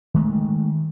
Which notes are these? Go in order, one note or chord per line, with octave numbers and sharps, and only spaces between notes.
D#3 G#3 A3